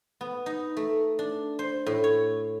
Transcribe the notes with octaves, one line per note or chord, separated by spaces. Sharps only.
B3
D#4
A3
D4
C5
A2
C#5